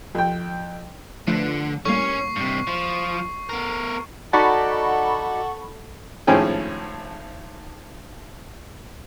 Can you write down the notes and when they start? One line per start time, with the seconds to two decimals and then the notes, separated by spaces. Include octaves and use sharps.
0.15 F2 G5
1.27 D3 F3 A3 B4
1.85 A2 G3 A#3 C#4 C#6 C7
2.36 G2 C3
2.67 F3
3.49 B3 A#4
4.33 D#4 F#4 A4 D5 F#5 A5 B5 C#6
6.27 G#1 A2 F3 C#4 G#4 G5